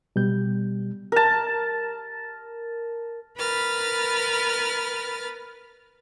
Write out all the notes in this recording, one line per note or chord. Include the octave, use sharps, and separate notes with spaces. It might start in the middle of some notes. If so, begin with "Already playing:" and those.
B2 G3 G6
A#4 A5
A#4 B4 B5 F6 A6